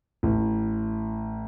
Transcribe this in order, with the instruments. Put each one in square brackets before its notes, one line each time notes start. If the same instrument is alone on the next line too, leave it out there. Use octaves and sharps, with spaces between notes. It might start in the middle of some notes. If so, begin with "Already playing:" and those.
[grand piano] A1